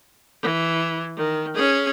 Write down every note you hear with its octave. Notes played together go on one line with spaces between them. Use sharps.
E3
D#3
C#4 G#4